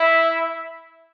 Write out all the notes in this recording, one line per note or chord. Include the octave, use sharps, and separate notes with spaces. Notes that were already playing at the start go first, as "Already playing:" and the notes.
Already playing: E4 E5